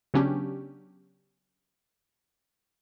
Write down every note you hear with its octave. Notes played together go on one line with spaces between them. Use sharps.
C#3 F#3 B3 C#4 D4 G4